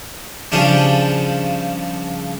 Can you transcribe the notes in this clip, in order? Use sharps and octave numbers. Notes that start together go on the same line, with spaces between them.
C#3 F3 G3 C#4 D4